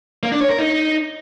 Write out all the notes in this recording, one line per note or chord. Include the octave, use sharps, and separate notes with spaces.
A#3
D4
C#5
A#4
D#4